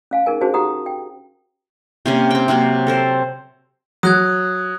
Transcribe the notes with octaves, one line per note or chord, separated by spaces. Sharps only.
C#4 F5 G#5
C#4 D#4 G#4 A#4 G#5
C#4 D4 F#4 G#4 C5 A5
D#4 F#4 G4 F#5 A#5 D#6
G5
C3 A#3 C#4
C4 G5
C3 F#3 A#3 C4
A4 A#4 C5
F#3 D#6 F#6 G#6